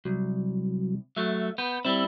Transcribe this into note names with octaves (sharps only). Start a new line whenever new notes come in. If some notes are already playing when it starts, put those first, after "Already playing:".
C2 F#3
F#3 A3 E5
B3 G6
G3 C4 E4 E6